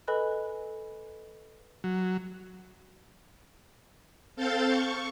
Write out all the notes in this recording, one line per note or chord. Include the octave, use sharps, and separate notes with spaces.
A4 B4 D#5 G#5 B5 F#6
F#3
C4 A4 F5 G6 A6
C#6